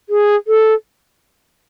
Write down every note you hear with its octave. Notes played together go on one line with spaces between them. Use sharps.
G#4
A4